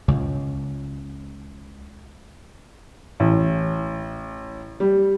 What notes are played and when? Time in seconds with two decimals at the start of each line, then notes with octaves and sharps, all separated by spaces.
0.08 C#2 C#3
3.20 A1
4.80 G3